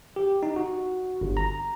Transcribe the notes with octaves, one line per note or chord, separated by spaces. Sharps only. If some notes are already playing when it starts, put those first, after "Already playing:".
G4
D#4
F#4
G1
A#5